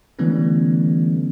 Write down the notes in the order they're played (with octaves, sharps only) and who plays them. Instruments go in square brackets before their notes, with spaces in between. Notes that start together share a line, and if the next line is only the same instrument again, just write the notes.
[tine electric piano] D3 E3 G3 A3 B3 C#4